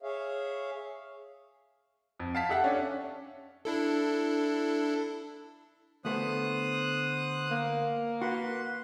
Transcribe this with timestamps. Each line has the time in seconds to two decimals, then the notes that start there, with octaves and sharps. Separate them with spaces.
0.02 G#4 C#5 E5 F5
2.20 F2
2.35 F5 A5 B6
2.49 G4 A4 E5 F#5
2.64 C#4 D4
3.65 D4 E4 A4
6.05 D2 A3 B3 C5 D#6 F#6
7.50 A#3
8.22 F#4 B4 C6